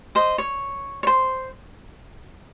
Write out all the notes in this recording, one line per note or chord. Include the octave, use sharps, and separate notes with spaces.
C5 D#5
C#5
C#5
C5